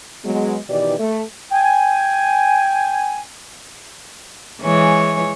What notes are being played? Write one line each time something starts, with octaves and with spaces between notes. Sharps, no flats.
F#3 G#3 B3
B2 D#3 E3 D#4 G4 D5
A3
G5 G#5
E3 G#3 C#5